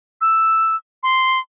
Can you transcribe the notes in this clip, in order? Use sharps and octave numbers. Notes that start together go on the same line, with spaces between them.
E6
C6